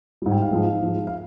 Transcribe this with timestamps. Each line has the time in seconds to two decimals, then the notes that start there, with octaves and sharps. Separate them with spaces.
0.22 G#2 G3
0.31 G5
0.42 F5
0.51 G#2 F3 G#3
0.82 G#2 F3 G#3
1.07 F5